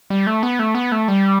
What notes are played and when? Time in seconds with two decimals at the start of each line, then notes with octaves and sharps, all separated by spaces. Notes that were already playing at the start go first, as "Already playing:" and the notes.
0.10 G3
0.27 A3
0.43 B3
0.59 A3
0.75 B3
0.92 A3
1.08 G3